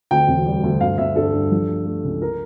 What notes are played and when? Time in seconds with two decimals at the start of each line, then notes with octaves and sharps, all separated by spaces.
0.11 D2 G5
0.27 E1
0.46 G3
0.63 D2
0.80 G1 F5
0.98 G1 E5
1.16 G2 A4
1.33 G2
1.51 F3
1.69 A3
1.86 A3
2.04 C#2
2.22 A#4